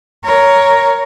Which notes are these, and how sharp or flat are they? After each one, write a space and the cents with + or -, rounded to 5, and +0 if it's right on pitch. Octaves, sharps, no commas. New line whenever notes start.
A#4 +0 C#5 +10